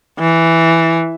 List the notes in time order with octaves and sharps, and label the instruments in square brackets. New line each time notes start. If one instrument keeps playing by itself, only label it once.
[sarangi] E3